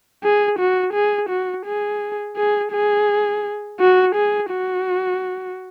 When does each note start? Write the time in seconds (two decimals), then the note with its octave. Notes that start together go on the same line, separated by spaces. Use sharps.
0.24 G#4
0.59 F#4
0.94 G#4
1.30 F#4
1.66 G#4
2.37 G#4
2.72 G#4
3.80 F#4
4.15 G#4
4.51 F#4